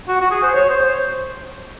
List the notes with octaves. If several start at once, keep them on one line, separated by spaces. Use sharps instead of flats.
F#4
F#4
G#4
C5
C#5
C5